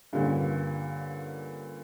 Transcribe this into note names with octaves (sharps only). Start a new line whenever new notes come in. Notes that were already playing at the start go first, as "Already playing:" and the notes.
G2 A#2 D3 C#4